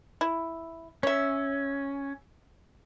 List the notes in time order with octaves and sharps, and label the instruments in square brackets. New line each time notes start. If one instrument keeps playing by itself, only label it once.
[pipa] E4
[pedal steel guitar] C#4 [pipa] C#5 E5